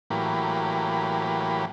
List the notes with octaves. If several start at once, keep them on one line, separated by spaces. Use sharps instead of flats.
A2 E3 F#3 A#3 G4 B5